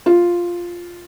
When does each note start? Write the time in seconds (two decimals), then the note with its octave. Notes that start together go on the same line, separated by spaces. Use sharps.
0.06 F4